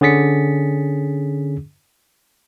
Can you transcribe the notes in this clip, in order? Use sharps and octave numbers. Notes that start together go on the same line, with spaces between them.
D3 C#4 G#4 A6 B6 C#7